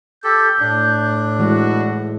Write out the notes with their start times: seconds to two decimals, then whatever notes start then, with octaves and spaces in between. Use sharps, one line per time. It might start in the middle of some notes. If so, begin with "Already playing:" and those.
0.24 G4 A4 G6
0.60 A2 D4
1.39 E3 G#3 E4 F#4